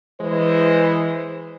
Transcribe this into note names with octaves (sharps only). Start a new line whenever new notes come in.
E3 G#3 B4 C5